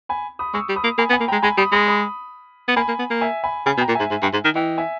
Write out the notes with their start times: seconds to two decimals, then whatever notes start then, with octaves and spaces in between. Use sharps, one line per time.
0.09 G#5 B5
0.39 B5 D#6
0.54 G#3 C#6 E6
0.69 G3
0.76 B5 D#6
0.84 A#3
0.98 A#3 G#5 B5
1.10 B3
1.13 G#5 B5
1.20 A#3
1.28 G#3 G5 A#5
1.42 G#3 G#5 B5
1.58 G3 B5 D#6
1.72 G#3 B5 D#6
1.87 B5 D#6
2.68 B3
2.76 A#3 G#5 B5
2.88 A#3
2.99 B3
3.10 A#3
3.21 E5 G#5
3.44 G#5 B5
3.66 C#3 G#5 B5
3.78 B2
3.80 G5 A#5
3.88 A#2
3.95 G#2 E5 G#5
4.10 G#2
4.22 G2
4.33 G#2
4.45 D#3
4.55 E3 D#5 G5
4.78 E5 G#5